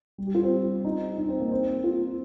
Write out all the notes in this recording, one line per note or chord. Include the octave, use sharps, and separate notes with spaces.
G3
G4
F4
C4
D#4
D#4
C4
A#3
C4
F4